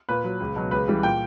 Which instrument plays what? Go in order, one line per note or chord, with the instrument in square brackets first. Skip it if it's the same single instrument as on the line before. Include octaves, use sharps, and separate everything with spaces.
[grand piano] A#2 B4
F#3
C#2
B2 F#3
C#2 B4
C#3 E3 G3
A#2 G5